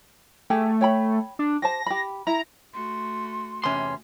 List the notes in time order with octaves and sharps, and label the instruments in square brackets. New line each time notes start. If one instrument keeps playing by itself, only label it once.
[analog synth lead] A3 [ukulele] G4 G#4 G5
[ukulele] C#5 G5 B5
[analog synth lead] D4
[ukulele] G4 C5 A5 [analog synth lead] A#6
[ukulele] G4 B5
[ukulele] E4 [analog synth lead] A#5
[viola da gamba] A3 F#4 [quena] C6
[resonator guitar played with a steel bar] E2 C3 C#4 [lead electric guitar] C6